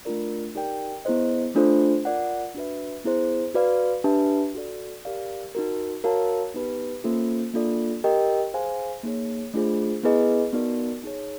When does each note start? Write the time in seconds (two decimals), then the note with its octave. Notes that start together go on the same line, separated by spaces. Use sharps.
0.05 A3 D4 F4 A#4 D5
0.55 D#4 G4 A#4 D5 G5
1.05 B3 E4 G#4 C5 D#5
1.55 A3 D4 F4 A4 C5
2.05 F4 A#4 D5 F#5
2.55 D4 F#4 B4 E5
3.05 B3 E4 G#4 C5
3.54 F#4 B4 D5 F5
4.04 D4 G4 B4 E5 A5
4.54 F#4 A4 D5
5.05 G4 A#4 D5 F5
5.55 D#4 F#4 A#4
6.04 F#4 A#4 C#5 F5 A5
6.54 B3 D#4 G4 B4
7.04 A#3 C#4 F4 A4 C5
7.53 A#3 D4 F4 A4 D5
8.04 G4 A#4 D#5 G5
8.54 G#4 C5 F5 G#5
9.04 A#3 D#4 G#4 C#5
9.54 A3 D4 F4 G#4 C5
10.03 B3 E4 G#4 B4 D#5
10.53 B3 D#4 F#4 A#4 D5
11.04 D#4 G#4 C#5